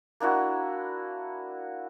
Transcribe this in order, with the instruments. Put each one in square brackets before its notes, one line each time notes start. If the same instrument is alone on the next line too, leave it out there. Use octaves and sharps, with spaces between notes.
[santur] A#3 D4 E4 F#4